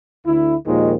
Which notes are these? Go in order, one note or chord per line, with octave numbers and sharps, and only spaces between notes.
D2 D3 E4
D#2 A#2 D#3 F3 G#3